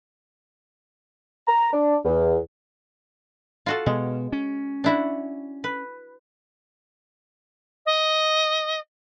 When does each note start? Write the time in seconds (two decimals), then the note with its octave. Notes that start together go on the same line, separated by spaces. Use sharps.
1.48 A#5
1.73 D4
2.05 E2
3.66 F4 F#4 A4
3.86 B2 G#3
4.32 C#4
4.84 D4 E4 F#4
5.64 B4
7.86 D#5